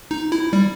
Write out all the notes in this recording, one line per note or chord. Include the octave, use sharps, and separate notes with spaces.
D#4
E4
G3